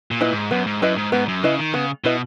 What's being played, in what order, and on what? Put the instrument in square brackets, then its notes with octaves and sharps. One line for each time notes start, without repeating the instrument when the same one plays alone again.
[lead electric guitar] A#2
[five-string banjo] E4 B4 D#5
[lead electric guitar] G#2
[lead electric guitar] F#2 [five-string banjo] B3
[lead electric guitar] G#2
[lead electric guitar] F#2 [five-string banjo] E4 B4 D#5
[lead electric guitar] G#2
[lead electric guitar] G#2 [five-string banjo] B3
[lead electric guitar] F#2
[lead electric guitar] C#3 [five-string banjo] E4 B4 D#5
[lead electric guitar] D#3
[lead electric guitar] C#3 [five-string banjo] B3
[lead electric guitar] B2 [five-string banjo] E4 B4 D#5